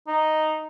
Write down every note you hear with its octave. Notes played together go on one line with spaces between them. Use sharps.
D#4